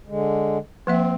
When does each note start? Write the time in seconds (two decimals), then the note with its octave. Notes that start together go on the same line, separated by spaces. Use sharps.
0.07 D3 G#3
0.87 F3 A#3 C4 E5